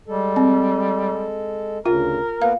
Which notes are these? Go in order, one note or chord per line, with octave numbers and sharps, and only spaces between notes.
G3 G#3 A4
C4
D2 C#3 F4 A#4
A#3 B3 B4 F5